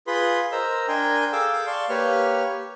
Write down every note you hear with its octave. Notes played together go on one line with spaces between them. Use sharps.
F4 G#4 B4 B5 C6
A#4 C5 D#5 A#5 E6
D4 A#4 G5 G#5 C6
G#4 A4 F5 G5 D6 E6
D5 F5 A5 C6 C#6
A#3 G4 B4 C#5 C#6 F6